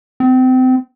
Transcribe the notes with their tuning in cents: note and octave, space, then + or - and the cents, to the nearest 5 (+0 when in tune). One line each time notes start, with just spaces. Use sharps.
C4 -30